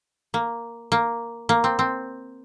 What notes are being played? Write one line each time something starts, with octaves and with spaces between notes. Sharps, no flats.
A#3
A#3
A#3
C4
C4